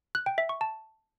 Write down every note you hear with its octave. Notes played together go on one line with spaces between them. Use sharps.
F#6
G5
E5
C#6
A5